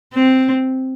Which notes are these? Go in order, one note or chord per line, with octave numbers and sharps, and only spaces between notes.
C4